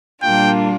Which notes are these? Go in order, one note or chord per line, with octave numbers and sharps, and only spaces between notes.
A#2 G3 A#3 D4 F4 G5